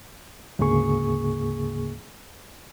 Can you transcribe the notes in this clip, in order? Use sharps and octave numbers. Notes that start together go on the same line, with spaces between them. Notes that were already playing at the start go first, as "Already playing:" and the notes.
D2 G#2 C#3 A#3 G#4 C#6